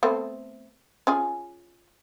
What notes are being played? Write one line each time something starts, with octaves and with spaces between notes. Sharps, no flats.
A3 B3 C4
C#4 F4 G#4